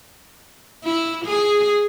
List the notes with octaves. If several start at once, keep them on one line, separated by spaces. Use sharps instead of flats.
E4
G#4